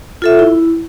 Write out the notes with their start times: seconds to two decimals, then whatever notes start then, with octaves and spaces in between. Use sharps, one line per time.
0.22 F4 A4 E5
0.39 E4